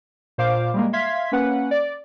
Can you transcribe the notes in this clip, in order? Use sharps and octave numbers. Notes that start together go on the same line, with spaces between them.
A#2 C5 F5 D6
G3 G#3 A#3
E5 F5 C6 G#6 B6
A#3 C#4 B4 F#5
D5